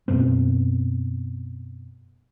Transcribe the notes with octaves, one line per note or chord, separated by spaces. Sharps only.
F#2 B2 B3 C4